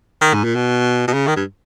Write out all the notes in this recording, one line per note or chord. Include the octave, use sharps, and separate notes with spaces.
D#3
G#2
A#2
B2
B2
C#3
D#3
G2